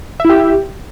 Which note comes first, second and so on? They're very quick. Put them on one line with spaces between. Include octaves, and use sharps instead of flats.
E5 E4 G4